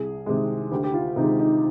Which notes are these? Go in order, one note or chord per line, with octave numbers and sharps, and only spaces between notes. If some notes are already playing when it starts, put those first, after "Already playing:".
Already playing: C2 G#4
C3 D#3 G#3
D2 G4
G4
F4
C3 D#3 G#3 D#4
D#4